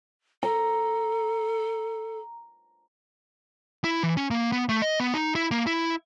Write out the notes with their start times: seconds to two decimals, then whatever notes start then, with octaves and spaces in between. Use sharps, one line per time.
0.43 A4 A#5
3.84 E4
4.03 E3
4.17 C#4
4.31 A#3
4.52 B3
4.69 A3
4.82 D#5
5.00 B3
5.14 D#4
5.35 E4
5.51 A#3
5.66 E4